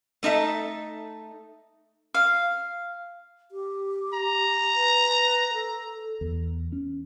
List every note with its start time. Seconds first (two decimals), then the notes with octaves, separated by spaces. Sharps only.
0.23 A3 D#4 A4 E5
2.14 F5
3.51 G4
4.13 A#5
4.75 B4
5.53 A4
6.21 E2
6.72 C#4